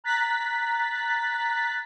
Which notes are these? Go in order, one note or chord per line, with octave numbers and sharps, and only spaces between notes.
A#5 F#6 A6 B6